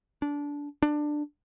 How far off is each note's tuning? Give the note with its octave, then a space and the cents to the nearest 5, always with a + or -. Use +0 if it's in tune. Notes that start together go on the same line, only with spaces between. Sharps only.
D4 -20
D4 +15